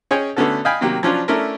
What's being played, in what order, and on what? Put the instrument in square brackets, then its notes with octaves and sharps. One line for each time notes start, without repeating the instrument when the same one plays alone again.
[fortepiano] C#4 G#4 C#5 D#5 G5 G#5
D3 A3 B3 C#4 F#4 A4
D#5 F5 G5 G#5 B5
C3 D#3 F#3 A#3 G4
F3 F#3 C#4 D4 F4
A3 C#4 D4 E4 A#4